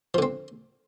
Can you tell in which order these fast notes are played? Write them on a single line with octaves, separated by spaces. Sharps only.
F3 D3 C4